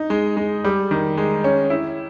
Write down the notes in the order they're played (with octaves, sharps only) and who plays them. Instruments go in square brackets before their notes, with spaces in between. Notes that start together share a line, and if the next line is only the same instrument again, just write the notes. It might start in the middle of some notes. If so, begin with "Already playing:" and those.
Already playing: [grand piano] D#4
G#3
G#3
G3
D#3
G#3
C#4
E4